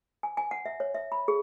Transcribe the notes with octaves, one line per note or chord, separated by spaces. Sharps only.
G#5
G#5
F#5
E5
C#5
E5
B5
G#4